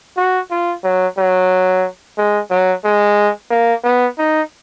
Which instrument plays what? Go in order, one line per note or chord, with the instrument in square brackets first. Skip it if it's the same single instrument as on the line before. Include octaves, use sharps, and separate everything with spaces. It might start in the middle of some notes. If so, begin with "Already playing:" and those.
[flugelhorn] F#4
F4
F#3
F#3
G#3
F#3
G#3
A#3
B3
D#4